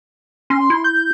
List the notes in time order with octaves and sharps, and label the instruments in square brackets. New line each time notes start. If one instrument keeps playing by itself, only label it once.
[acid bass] C#4 [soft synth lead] C6
[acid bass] E4
[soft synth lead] G6